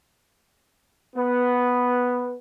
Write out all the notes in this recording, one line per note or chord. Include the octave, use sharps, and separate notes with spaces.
B3